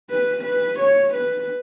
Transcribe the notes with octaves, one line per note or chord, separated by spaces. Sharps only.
B4
B4
C#5
B4